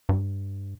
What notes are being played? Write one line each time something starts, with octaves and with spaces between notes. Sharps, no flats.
G2